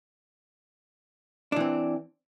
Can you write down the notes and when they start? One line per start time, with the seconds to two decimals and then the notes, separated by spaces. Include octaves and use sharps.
1.52 D4
1.56 E3
1.60 C4